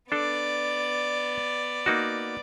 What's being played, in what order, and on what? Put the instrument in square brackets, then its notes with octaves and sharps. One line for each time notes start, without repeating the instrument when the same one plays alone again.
[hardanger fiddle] B3 D5 [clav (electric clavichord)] D4 A4
[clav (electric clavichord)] A#3 D#4 F#4